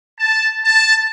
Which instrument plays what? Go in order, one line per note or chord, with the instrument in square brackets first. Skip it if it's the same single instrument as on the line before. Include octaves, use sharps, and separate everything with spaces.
[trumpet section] A5
A5